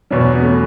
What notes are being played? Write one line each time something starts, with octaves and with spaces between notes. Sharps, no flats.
E2 B2 F#3 D4
C#4
B3
A3 C#4